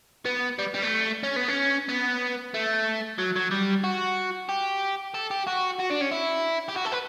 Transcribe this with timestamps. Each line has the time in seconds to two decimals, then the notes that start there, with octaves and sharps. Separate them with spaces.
0.26 B3
0.59 G3
0.74 G3
0.82 A3
1.23 C#4
1.36 B3
1.48 C#4
1.89 B3
2.54 A3
3.18 F#3
3.36 F#3
3.51 G3
3.84 F#4
4.49 G4
5.14 A4
5.31 G4
5.47 F#4
5.80 F#4
5.91 D4
6.01 C#4
6.12 E4
6.69 G4
6.77 F#4
6.86 A4
6.93 B4